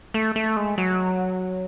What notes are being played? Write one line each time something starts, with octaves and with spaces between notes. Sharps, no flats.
A3
A3
G#3
F#3